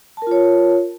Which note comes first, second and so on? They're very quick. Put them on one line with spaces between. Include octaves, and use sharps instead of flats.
A5 A#4 F4 C#5